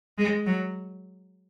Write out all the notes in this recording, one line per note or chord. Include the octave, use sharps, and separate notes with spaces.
G#3
F#3